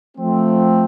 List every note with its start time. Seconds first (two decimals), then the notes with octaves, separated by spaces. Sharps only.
0.17 F3 A3 C4